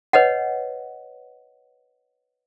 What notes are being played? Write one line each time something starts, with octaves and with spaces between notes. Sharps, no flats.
B4 C#5 D#5 F#5